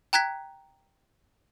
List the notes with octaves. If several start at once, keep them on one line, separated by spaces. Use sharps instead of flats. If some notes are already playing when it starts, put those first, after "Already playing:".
G5 A#5 F#6 G#6 B6